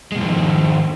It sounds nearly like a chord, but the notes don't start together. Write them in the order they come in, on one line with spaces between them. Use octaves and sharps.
G#3 B2 F3 G#2 D#3